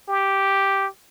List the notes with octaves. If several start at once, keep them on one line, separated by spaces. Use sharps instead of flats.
G4